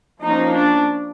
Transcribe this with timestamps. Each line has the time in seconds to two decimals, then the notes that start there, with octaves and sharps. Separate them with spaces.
0.24 F3 A#3 C#4 D#4
0.54 D4